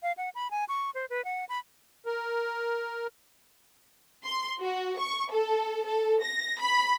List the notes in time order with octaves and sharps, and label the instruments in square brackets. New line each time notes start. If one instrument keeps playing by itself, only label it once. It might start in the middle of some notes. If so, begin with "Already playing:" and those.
[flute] F5
F#5
B5
G#5
C#6
C5
B4
F#5
B5
[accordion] A#4
[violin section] C6
F#4
C#6
A4
A4
A#6
B5